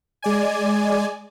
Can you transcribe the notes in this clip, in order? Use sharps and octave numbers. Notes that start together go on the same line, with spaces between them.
G#3 D5 G#5